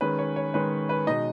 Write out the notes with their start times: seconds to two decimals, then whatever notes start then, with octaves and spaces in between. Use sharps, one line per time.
0.01 D#3 G#3 C#4 B4
0.19 C#5
0.36 C#5
0.54 D#3 G#3 C#4 B4
0.89 B4
1.07 B2 G#3 D#4 D#5